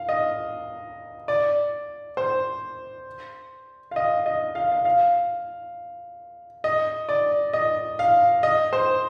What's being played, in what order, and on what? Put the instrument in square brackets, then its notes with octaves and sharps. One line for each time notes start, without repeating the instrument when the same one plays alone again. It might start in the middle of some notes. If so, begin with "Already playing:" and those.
Already playing: [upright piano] F5
D#5
D5
C5
F5
D#5
D#5
F5
F5
F5
D#5
D5
D#5
F5
D#5
C5